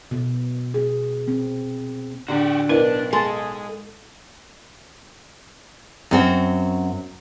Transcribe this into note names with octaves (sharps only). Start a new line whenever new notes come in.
B2
G#4
C4
A2 D3 F#4 G4
B1 D4 E4 A#4 B4
G#3 A4 G#5 C6 A6
F#2 C4 F#4